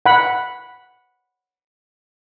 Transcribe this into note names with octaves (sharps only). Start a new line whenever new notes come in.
F#5 B5